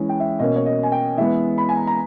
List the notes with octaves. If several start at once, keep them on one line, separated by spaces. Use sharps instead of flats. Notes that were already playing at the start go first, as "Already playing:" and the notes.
Already playing: E3 G#3 C#4
G5
E5
B2 A#3 C#4 D#5
C#5
D#5
G#5
G5
E3 G#3 B3 E5
B5
G#5
A#5
A#5